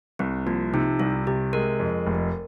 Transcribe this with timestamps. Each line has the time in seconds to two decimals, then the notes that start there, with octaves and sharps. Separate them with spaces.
0.19 C2 C4
0.46 F3 A#3
0.74 C3 D#4
1.00 C2 F4
1.27 C3 G4
1.53 G#3 A#4
1.80 F2
2.07 F1